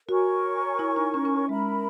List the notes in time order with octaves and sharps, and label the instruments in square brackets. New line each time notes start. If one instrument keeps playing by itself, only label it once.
[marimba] F#4 [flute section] A#4 C#5 G#5 C#6
[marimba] E4
D#4
C#4
C#4
[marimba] G#3 [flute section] A#4 E5 B5